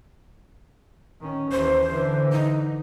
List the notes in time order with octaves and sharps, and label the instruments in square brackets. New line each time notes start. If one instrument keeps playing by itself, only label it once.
[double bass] D#3 C#4
[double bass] D#2 E3 [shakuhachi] C5
[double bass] D3 E3
[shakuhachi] D#4